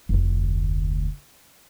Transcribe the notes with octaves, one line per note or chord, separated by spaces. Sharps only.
F1 D2